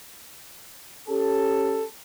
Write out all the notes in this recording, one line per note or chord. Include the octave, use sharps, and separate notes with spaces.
C#4 G4 A4